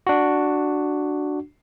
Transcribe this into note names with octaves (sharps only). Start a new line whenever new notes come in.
D4 F#4